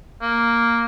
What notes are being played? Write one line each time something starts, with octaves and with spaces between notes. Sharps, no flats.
A#3